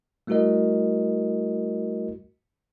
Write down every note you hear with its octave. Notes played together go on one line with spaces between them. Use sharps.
G3 A3 E4 F#4 A#4 D#5